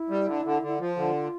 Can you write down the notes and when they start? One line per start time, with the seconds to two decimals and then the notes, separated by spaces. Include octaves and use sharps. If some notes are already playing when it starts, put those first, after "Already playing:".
Already playing: E4
0.10 G3
0.28 D3
0.45 D3
0.62 D3
0.67 E4
0.79 F3 F4
0.97 D3